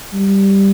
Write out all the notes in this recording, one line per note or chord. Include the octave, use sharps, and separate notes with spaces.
G3